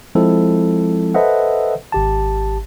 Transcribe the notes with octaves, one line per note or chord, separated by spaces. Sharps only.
F3 G#3 C4 E4 A4
A4 B4 C5 D#5 E5 F#5
G#1 G4 A5